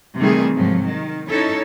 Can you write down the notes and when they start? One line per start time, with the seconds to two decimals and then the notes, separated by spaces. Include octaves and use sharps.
0.18 C3 D#3 E3 G3 A3 G#4
0.54 G#2 C3 F3 F#3
0.85 D#3
1.29 C#4 D#4 E4 A4 C#5